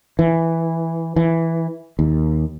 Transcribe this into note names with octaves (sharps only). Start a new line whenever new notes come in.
E3
E3
D#2